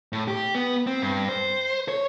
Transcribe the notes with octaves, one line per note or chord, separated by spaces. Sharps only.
A2
G4
B3
C4
G2
C5
C#5